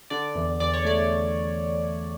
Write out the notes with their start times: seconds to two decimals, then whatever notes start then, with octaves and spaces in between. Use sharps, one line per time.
0.10 D3 D5
0.35 E2
0.60 E2 D5
0.74 C#5
0.85 A3 D5